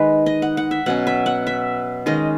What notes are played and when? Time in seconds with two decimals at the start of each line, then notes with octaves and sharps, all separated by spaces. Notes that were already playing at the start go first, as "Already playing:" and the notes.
Already playing: D#3 G#3 D#4 B4
0.26 D#5
0.42 F#5
0.57 F#5
0.71 E5
0.86 B2 F#3 C#4 F#5
1.07 E5
1.26 F#5
1.47 E5
2.06 D#3 G#3 C#4 D#5